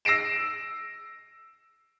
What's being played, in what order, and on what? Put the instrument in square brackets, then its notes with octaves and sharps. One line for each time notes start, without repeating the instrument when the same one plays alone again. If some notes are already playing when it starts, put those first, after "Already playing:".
[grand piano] E6 A#6 C7 D7 E7